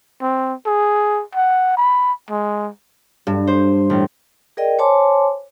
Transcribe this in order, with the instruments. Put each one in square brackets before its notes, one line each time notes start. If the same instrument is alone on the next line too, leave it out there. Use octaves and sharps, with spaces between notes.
[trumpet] C4
G#4
F#5
B5
G#3
[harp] G2
C5
A1
[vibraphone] G#4 A#4 D5 D#5 G5
C5 C#5 G#5 A5 C6 D6